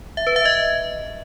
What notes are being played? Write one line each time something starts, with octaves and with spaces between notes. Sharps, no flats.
E5
B4
E5
D#5